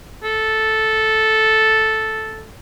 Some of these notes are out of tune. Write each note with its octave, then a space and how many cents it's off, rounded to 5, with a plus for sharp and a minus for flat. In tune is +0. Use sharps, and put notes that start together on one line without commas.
A4 -5